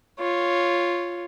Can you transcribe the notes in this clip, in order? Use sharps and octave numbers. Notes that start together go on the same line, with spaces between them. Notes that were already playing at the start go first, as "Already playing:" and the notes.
F4 C#5